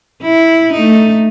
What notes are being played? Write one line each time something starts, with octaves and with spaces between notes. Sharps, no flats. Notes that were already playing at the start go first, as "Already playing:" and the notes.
E4
A3 D#4